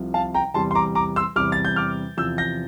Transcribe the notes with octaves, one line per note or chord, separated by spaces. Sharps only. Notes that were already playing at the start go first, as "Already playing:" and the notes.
Already playing: C2 C3 F3
F5 A5
G5 A#5
E2 C3 G3 A5 C6
C6
A#5 D6
A#5 D6
C6 E6
E2 C3 G3 D6 F6
A6
G6
D6 F6
E2 C3 F3 E6 G6
G6 A#6